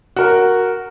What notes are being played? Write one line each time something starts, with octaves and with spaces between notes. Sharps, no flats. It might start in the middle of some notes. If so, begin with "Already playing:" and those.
F#4 A#4